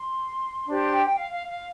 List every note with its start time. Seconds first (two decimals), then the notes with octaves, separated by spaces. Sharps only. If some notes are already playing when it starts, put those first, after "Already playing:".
Already playing: C6
0.67 D4 G4 C5
0.91 G5
1.07 G5
1.15 F5
1.31 F5
1.48 F5